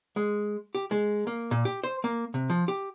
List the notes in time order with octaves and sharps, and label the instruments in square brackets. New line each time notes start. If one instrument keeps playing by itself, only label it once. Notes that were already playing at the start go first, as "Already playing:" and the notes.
[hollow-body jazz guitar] G#3
G4
G#3
A#3
A#2
G4
C5
A#3
C3
F3
G4